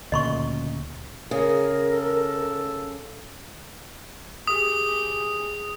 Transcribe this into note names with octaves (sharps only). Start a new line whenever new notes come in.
D2 A#2 C#3 D#5 C6 C#6
C#3 G#4 A#4
A4
G4 G#4 D#6